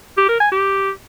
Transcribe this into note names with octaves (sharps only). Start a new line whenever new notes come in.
G4
A#4
G#5
G4